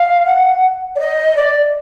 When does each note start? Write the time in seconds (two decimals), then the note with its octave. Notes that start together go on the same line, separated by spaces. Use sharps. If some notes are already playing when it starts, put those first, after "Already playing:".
Already playing: F5
0.25 F#5
0.95 D5
0.99 D#5
1.36 D5